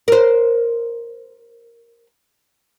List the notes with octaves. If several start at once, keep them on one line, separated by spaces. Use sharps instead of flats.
A#4 C5